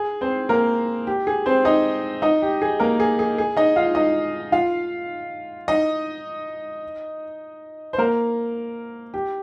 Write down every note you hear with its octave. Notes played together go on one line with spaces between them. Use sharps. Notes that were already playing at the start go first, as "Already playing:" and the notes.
Already playing: G#4
C4 C5
A#3 A#4
G4
G#4
C4 C5
D#4 D#5
D#4 D#5
G4
G#4
A#3 A#4
G#4
G#4
G#4
D#4 D#5
F4 F5
D#4 D#5
F4 F5
D#4 D#5
C5
A#3 A#4
G4